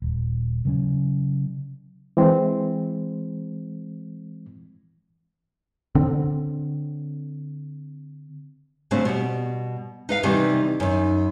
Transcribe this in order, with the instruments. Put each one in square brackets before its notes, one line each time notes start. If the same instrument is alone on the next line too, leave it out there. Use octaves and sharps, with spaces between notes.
[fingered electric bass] D#1
C#3 F#3 A3 C#4
[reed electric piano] E3 G#3 C4
[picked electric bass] D3 C4
[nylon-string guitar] A2 C#3 F#3 A3 C4 D4
B2 G3
D#4 B4 F5
C3 D#3 E3 G3 C4 D4
F#2 D#3